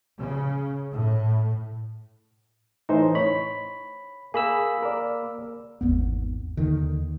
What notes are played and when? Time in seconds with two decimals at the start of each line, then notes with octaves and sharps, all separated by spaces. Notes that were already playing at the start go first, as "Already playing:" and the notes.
0.19 C#3
0.92 A2
2.89 A2 E3 D#4 C5
3.15 C#5 B5
4.34 A#3 G#4 B5 E6
4.83 A#4 D5
5.81 G#1 E2 B3
6.57 D#2 D3 D#3